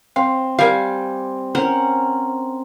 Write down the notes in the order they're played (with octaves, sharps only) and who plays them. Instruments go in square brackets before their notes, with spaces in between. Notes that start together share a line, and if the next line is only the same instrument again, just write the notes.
[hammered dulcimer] C4 [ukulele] F5
[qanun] G3 G#5 D6 [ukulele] A#4 F5
[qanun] C#4 A#4 F#5 [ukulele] C5